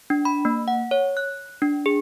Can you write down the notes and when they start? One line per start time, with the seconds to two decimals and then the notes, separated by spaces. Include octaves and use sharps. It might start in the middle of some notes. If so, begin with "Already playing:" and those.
0.10 D4
0.25 B5
0.45 A#3
0.68 F#5
0.91 C#5
1.17 F#6
1.62 D4
1.86 G#4